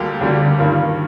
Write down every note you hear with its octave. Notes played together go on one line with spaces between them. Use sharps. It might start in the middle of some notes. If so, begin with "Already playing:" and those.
Already playing: D2 D3 G3 A#3 G4
D2 D3 G3 A#3
G2 D#3 A#3 F4